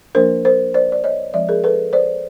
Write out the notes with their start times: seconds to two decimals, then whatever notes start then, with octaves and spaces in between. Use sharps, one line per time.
0.15 F3 A#3 D4 A#4 C5
0.45 A#4 C5
0.74 C5 D5
0.92 D5
1.04 C#5 D#5
1.34 F3 G#3 C4 D5 E5
1.49 G#4 A#4
1.64 A4 B4
1.93 C5 D5